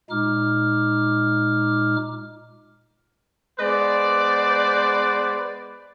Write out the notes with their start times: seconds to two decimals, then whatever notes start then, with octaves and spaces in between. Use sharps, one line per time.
0.10 A#2 G#3 D#4 D6 F6
3.60 G#3 B3 B4 C5 D5